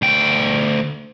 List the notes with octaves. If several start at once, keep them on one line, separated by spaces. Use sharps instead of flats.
D2 G5